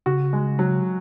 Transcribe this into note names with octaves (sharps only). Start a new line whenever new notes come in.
C#3 F#4
G#3
F#3